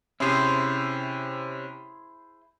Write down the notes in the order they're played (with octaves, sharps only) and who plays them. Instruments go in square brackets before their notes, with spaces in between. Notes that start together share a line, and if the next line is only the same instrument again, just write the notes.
[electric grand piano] C3 C#4 [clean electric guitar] E4 G#4 C5